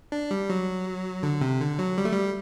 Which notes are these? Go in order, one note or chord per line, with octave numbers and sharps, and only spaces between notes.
D4
G3
F#3
D3
C3
D3
F#3
G3
A3
G3